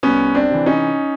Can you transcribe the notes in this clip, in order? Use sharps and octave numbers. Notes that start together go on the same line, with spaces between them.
C2 B3 C#4
C4 D4
C3 E3
C#4 D#4